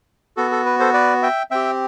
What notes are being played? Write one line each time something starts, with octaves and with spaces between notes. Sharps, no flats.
B3 F#4 A4
A4
B4
A4 C5
B4 D5
E5 G5
C4 G4 E5 G5